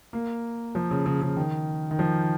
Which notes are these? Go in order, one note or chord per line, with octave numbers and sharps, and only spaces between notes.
A#3
F3
C#3
C#3
C#3
D#3
D#3
F3